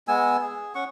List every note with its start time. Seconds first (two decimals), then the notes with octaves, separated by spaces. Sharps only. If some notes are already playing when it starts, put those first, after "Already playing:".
0.08 G#3 B3 G#5 E6
0.41 G#4
0.75 C#4 F#5 C#6